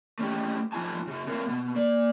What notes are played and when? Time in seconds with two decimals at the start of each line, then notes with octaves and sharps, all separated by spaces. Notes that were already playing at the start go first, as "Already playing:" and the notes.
0.19 A3 C#4 D#4 G4
0.72 G#2 F3 D#4 F4 G#5 A5
1.07 C#3 F#4
1.27 A3 C4 A#4 C#5 F5
1.48 B2 B3
1.75 A#3 D5